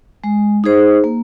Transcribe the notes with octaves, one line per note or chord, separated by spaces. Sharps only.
G#3
D#4 G#4 C5
A#3